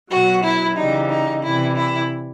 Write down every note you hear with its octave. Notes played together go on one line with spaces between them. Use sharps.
B2 F#3 F#4
E4
C#3 E3 G3 D#4
D#4
C3 E3 G3 E4
E4